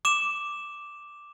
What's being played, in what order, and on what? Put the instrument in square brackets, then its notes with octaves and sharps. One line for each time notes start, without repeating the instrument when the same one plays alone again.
[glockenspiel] D6 E7